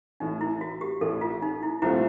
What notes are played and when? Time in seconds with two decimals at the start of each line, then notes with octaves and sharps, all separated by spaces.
0.20 A1 A2 E3 D#4
0.41 E4
0.61 F#4
0.81 G4
1.01 A1 A2 E3 A4
1.21 F4
1.42 D#4
1.63 E4
1.82 C2 A#2 F3 A3 C4 E4